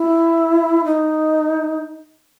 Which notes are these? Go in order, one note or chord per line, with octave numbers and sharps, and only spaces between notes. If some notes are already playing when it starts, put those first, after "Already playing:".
Already playing: E4
D#4